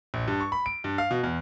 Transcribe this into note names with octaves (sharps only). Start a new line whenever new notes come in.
A#1
G2
C#6
B5
D7
G2
F5
B2
E2